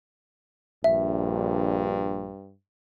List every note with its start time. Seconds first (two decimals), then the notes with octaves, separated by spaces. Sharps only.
0.84 A#1 G2 E5